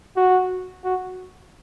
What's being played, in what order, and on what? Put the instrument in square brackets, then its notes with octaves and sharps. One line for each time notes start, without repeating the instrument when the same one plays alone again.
[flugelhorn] F#4
F#4